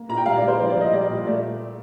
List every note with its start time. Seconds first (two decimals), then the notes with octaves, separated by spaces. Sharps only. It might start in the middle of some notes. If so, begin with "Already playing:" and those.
Already playing: A#3
0.09 A#2 A#5
0.17 G5
0.26 G3 F5
0.36 D5
0.42 G3
0.48 C5
0.60 A#1 C5
0.70 D5
0.76 A#1 D#5
0.92 G3 D5
1.09 A#2
1.26 A3 D5